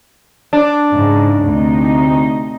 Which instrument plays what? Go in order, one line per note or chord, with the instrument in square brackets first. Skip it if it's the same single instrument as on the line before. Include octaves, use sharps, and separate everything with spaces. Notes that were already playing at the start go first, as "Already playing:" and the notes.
[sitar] D4
[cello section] G#2 C#3
D2 C3 D#4